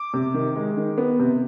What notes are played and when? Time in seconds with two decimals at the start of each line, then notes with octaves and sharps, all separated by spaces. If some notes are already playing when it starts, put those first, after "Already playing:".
Already playing: D6
0.13 C3
0.34 D#3
0.56 G#3
0.77 D#3
0.98 B3
1.19 C3